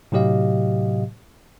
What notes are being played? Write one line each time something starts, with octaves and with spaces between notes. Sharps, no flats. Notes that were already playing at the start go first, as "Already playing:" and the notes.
A2 C3 F#3 G4 D#5 F5